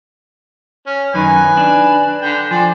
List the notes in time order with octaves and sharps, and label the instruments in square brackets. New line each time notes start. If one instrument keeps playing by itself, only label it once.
[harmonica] C#4
[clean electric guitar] F#2 D#3 D#4 [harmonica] B4 G#5
[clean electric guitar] D4
[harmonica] D3 G5
[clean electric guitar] F3 [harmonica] D5 G#5